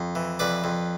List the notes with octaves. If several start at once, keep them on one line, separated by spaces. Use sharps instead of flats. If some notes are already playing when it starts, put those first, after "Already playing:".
Already playing: F2
E3
F2 B4 D5
F2